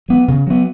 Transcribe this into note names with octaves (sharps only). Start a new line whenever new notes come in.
F#3 B3
C#3
F#3 B3